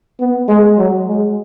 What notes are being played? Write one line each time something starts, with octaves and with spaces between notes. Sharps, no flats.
B3
G#3
F#3
G#3